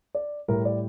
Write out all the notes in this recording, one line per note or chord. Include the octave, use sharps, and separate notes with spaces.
D5
A2 G3 A#4
D5